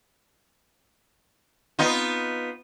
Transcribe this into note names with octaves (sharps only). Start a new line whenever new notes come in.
B3 D#4 F4